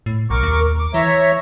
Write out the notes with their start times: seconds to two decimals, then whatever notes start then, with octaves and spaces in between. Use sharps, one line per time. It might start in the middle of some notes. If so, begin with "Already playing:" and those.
0.06 A2
0.30 B1 A#4 C#6 D6
0.43 D#2
0.79 D6
0.94 E3 C#5 E5 A#5